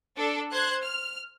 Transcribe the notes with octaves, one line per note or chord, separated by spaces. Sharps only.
D4 A4
C5 F#6 G#6
F6